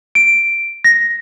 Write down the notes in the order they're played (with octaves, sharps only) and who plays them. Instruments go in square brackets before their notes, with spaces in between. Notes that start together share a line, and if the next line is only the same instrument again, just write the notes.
[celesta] D7
A#6